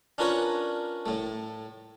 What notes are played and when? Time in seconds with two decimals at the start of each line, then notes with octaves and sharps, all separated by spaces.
0.18 C#4 D4 F4 A#4 B4 C#5
1.06 A2 A3